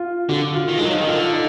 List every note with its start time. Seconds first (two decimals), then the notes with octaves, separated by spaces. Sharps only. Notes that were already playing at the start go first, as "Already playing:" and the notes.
Already playing: F4
0.29 D3 F#4
0.55 F4
0.68 D#3
0.78 G#3
0.81 F#3 D#4
0.93 F3
1.00 D#3
1.07 D3 F4
1.33 D#4